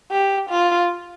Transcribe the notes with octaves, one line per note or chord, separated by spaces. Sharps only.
G4
F4